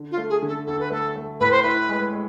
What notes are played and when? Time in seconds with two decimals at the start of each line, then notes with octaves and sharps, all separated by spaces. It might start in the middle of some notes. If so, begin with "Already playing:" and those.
Already playing: D3
0.11 F4
0.17 A3
0.30 G#4
0.42 D3
0.48 A4
0.67 D2 A4
0.80 B4
0.90 A3 A4
1.16 A3
1.40 A2 B4
1.51 C5
1.63 E4 B4
1.89 G#3
2.13 G#3